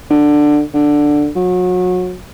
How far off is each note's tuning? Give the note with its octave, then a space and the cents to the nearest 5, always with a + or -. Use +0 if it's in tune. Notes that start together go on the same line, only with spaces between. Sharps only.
D3 +10
D3 +5
F#3 -30